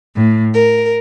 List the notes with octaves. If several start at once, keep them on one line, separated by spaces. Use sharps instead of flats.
A2
A#4